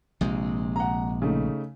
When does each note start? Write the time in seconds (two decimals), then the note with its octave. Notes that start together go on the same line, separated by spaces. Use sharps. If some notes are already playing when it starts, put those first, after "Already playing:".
0.21 A#1 C3 G#3
0.76 F#5 A#5
1.22 C#3 A3 D#4